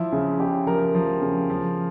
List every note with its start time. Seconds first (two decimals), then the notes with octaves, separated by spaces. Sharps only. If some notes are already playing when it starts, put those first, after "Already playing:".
Already playing: F3 E4
0.12 C#3
0.40 C#3 G4
0.67 F3 A#4
0.95 F3
1.21 C#3
1.50 F3